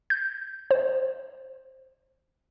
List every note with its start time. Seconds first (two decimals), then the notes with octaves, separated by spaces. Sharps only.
0.10 G6
0.71 C5